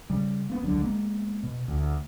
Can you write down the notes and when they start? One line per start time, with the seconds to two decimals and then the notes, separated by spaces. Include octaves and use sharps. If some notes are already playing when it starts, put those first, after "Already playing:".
0.10 C#3 G3
0.50 A#3 B3
0.61 E1 C#2 D3 F#3
0.82 G#3 A#3 B3
1.43 B2
1.68 D2